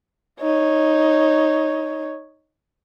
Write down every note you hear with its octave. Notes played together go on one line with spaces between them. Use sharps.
D#4 C#5